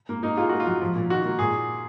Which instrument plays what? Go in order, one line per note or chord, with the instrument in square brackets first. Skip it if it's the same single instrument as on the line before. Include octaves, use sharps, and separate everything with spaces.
[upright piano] A#3
[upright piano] A#3 [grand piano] D#4
[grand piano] F4 [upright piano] G#4
[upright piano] A#3 [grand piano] F#4
[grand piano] F4
[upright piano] F#3
F3
A#2
[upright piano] D#3 [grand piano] F#4
[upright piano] A#3
[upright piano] A#2 [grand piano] G#4